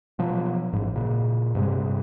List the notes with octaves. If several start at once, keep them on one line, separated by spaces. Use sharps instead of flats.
B2 F3 F#3
A1 G#2
A#2 C#3
G2 C3 G3 G#3